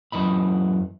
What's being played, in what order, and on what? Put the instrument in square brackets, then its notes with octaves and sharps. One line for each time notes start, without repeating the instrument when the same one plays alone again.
[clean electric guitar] F#2 E3 D#5 B5